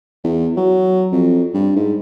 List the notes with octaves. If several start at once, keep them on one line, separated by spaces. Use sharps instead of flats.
E2
F#3
F2
G2
G#2